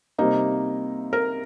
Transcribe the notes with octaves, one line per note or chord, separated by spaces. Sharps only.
C3 G3 A#3 D#4
A#4